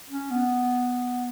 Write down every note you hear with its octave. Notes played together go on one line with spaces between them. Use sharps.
C#4
B3